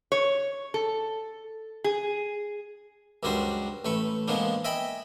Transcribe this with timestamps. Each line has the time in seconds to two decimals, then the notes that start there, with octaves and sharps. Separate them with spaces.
0.12 C#5
0.74 A4
1.84 G#4
3.23 C#2 F#2 G3 D4 F#4 C5
3.85 A1 A3 B4 C#6
4.28 A#2 F3 G#3 B3 D4
4.64 D#5 E5 G5 G#5 B5